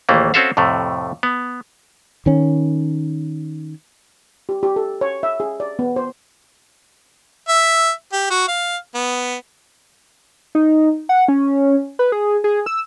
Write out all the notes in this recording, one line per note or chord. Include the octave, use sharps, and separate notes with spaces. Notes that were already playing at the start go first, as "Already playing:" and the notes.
A#1 D#2 E3 A3 A#3
C4 C#4 F#4 A4 E5 F5
F2 A2 C3 A3
B3
D#3 C#4
G4
G4
A4
C#5
E5
G#4
D5
B3
C5
E5
G4
F#4
F5
B3
D#4
F#5
C#4
B4
G#4
G#4
E6